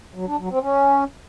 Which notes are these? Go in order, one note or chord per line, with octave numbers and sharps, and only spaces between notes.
F#3
D4
F#3
C4
C#4